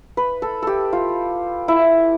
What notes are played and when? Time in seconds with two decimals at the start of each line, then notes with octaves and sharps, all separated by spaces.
0.17 B4
0.42 A4
0.63 G4 A4
0.93 F4
1.68 E4